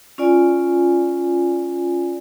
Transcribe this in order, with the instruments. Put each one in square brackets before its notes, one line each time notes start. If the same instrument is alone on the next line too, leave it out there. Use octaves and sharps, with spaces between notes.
[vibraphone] C#4 F4 D5 G#5